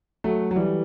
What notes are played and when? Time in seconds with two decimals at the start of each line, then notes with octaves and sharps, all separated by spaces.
0.24 F#3 A3
0.51 F#3
0.56 E3 G3